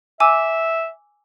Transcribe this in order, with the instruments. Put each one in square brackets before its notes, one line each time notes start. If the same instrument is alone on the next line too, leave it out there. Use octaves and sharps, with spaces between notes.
[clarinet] E5 [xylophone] G#5 D6 E6